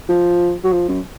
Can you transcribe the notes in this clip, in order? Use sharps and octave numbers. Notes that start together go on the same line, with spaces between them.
F3
F#3
F3
F#2